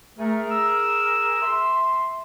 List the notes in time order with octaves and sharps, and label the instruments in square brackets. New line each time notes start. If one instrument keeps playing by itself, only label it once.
[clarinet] A3 [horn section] G#4 A#4
[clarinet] E6
[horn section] E5 C6